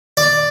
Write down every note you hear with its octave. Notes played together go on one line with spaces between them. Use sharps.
D5